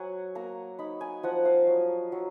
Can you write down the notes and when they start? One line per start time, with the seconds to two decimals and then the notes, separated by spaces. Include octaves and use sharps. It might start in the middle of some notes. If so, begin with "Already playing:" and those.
Already playing: F#3 F#5 G#5
0.35 A#3 A#5
0.79 D#4 B5
1.01 G#5
1.23 F3 F#5
1.45 F5
1.67 F#3
2.12 F#3